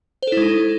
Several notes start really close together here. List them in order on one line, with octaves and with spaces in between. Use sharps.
C5 A4 E4 G#3 D#4